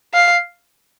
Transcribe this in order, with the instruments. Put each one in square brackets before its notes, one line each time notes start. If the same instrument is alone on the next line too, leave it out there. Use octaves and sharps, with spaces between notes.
[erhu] F5